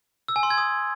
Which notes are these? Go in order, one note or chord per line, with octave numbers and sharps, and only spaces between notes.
E6
G#5
C6
G#6
D#6